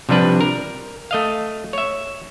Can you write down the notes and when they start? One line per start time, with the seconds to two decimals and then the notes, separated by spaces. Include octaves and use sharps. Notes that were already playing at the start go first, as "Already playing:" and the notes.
0.09 C3 F3 G3 D4 B4
0.41 A#4
1.11 A3 D#5 F5
1.73 C#5 E5